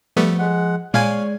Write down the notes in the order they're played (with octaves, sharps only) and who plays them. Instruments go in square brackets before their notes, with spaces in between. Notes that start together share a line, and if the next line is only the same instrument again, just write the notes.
[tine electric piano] F3 [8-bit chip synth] G3 A3 B3
[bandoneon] G#3 F#5
[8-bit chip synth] A#2 F5 G#5 [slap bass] G#3 [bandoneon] C#5 [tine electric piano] D5